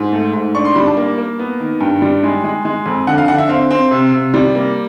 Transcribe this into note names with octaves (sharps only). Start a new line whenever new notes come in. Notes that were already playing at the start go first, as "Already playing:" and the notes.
Already playing: G#2
A3
G#2
D4 C#6
C6
G3 B5
A5
A#3
A#3
B3
D#3
G2 G5
G3
G#3
G#3
G#3
F2
D3 F#5
F5
D3 F#5
E5
C4 F5
C4
C3
C3
G3
A#3